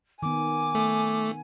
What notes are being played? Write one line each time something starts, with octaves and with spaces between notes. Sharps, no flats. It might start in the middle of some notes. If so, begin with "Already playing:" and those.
D#3 B3 G#5 D6
A3